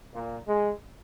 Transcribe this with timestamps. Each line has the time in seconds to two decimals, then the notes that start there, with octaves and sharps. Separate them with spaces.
0.14 A#2
0.47 G#3